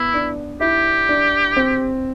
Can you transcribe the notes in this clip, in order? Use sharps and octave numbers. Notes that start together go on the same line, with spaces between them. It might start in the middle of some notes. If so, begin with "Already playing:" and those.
Already playing: B3 E4
D4
E4 G4
D4
C4